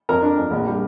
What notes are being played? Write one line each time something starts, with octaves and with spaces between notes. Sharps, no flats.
F2 A#4 A#5
D4
F2
A#1
G3